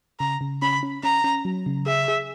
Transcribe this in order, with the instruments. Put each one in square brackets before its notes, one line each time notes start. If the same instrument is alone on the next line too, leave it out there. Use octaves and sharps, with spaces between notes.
[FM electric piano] C#3 [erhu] A#5
[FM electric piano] C#3
[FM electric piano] C#4 [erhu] B5
[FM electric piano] C#4
[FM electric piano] C#4 [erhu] A#5
[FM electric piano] C#4
F#3
C#3
[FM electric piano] G#4 [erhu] E5
[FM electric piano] G#4